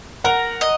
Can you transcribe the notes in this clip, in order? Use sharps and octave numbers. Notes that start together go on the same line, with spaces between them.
A#4 F#5 A#5
D#5